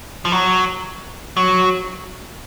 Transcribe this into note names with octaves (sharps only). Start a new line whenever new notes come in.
F3
F#3
F#3